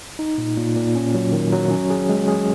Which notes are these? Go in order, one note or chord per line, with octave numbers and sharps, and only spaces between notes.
D#4
A#2
A#2
A#2
C#4
F#3
D#3
F#3
C#4
G#4
G#3
G#4